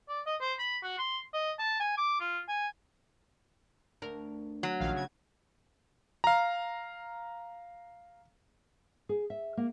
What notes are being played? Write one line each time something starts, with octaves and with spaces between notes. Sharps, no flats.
D5
D#5
C5
B5
F#4
C6
D#5
A5
G#5
D6
F4
G#5
D2 A#4
F#3
A#1 D#3 F5
C#3 G#6
F5 A#5
G#4
E5
A#3